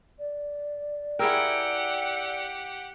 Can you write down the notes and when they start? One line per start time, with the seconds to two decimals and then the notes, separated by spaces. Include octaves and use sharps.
0.19 D5
1.19 E4 G4 G#4 A#4 F#5 G5 E6 D7